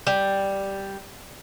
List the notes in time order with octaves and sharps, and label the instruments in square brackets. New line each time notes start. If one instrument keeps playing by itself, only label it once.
[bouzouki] G3